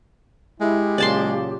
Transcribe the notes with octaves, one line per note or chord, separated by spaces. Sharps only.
G#3 E4 G4
A#2 C#3 F#3 D5 A5 C6